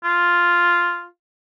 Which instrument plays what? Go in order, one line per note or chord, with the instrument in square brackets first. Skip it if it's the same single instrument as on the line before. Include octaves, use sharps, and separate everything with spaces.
[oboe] F4